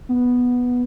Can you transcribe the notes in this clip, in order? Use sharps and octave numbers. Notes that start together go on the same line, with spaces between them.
B3